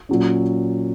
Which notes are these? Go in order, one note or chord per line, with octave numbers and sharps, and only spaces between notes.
A#2 F#3 C#4